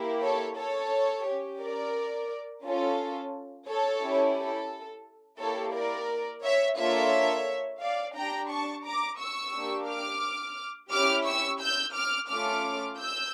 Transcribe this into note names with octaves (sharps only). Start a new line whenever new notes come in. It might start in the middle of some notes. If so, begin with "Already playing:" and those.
Already playing: A#3 E4 G4
A4 C#5
A4 C#5
C#4 G4
A#4 D5
C#4 F4 A4
A4 C#5
C#4 E4 G4
A4
A#3 E4 G4 A4 C#5
A#4 D5
C#5 E5
A#3 D4 F4 A4 C#5 E5
D5 F5
D4 G4 G5 A#5
A5 C#6
A#5 D6
C#6 E6
A#3 D4 G4
D6 F6
C#4 E4 G4 D6 F6
C#6 E6
E6 G6
D6 F6
A3 C#4 F4 A4 D6 F6
E6 G6